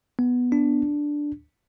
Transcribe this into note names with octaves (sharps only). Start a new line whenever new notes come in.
B3
D4